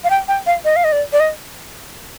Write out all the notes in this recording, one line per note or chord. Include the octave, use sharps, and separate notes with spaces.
F5
G5
G5
F5
D#5
F5
D#5
D5
D5
D#5